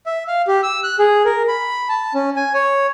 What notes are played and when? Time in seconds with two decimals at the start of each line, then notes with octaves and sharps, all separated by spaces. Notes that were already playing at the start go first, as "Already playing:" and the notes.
0.06 E5
0.28 F5
0.47 G4
0.63 E6
0.83 F#6
0.99 G#4
1.25 A#4
1.48 B5
1.89 A5
2.14 C#4
2.36 G#5
2.54 C#5